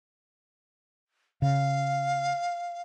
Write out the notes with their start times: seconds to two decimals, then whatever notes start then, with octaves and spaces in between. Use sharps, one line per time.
1.42 C#3 F5